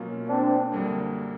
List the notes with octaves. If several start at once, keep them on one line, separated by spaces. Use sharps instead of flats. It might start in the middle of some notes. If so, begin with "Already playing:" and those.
Already playing: B2 F#3 A#3 C#4 F4
C4 D4
F#2 D3 G3 A#3